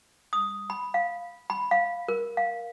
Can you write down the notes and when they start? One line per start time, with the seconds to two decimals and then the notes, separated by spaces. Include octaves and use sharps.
0.33 D#6
0.70 B5
0.94 F5
1.50 B5
1.71 F5
2.08 A#4
2.37 F5